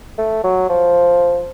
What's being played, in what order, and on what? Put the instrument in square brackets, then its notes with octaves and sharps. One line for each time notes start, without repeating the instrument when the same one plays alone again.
[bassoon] A3
F#3
F3